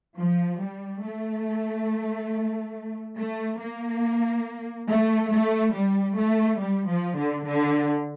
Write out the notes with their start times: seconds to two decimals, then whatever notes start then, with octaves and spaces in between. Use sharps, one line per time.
0.17 F3
0.60 G3
1.03 A3
3.18 A3
3.61 A#3
4.89 A3
5.32 A3
5.75 G3
6.18 A3
6.61 G3
6.90 F3
7.18 D3
7.47 D3